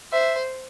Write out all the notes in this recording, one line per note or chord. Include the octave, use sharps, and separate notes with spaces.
C5 E5